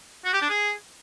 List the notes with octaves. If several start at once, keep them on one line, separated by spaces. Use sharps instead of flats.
F#4
G4
D4
G#4